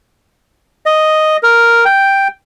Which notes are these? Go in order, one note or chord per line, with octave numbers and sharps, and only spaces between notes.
D#5
A#4
G5